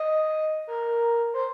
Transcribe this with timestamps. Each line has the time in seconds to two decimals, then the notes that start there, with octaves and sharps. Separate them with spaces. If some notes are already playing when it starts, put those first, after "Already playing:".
Already playing: D#5
0.67 A#4
1.34 C5